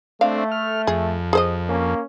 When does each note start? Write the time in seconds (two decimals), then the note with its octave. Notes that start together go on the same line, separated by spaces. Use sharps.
0.21 A3 C4 D4 F5
0.52 F6
0.87 F2 G#4
1.33 G#4 C5 D#5
1.69 A#3 C#4